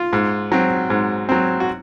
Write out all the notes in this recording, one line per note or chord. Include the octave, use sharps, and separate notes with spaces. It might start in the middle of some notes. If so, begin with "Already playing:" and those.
Already playing: F4
G#2
F#3 C4
G#2
F#3 C4
F#4